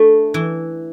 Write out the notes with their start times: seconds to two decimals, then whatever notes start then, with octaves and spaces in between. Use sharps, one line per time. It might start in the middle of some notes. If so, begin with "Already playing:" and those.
Already playing: A3 D4
0.34 E3